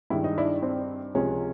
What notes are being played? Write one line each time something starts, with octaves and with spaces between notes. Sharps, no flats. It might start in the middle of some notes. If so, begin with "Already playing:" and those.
G2 D#3 G#3 E4
D#4
D4 E4
C4 D4
C#2 C3 F3 G#3 C#4